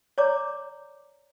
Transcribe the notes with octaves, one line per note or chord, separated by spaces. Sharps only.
C#5 D5 A#5 D6